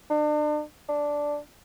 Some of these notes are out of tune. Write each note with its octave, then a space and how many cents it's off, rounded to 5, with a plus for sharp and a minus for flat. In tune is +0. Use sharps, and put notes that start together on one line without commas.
D4 +40
D4 -5